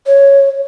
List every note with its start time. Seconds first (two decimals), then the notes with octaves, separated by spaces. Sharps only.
0.07 C#5